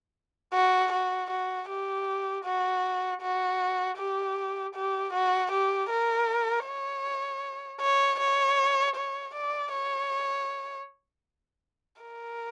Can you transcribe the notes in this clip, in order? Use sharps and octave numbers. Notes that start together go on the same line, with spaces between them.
F#4
F#4
F#4
G4
F#4
F#4
G4
G4
F#4
G4
A#4
C#5
C#5
C#5
C#5
D5
C#5
A#4